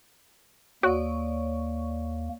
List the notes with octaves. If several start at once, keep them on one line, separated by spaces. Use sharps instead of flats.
D#2 A#3 F#4 C#5 D5 C#6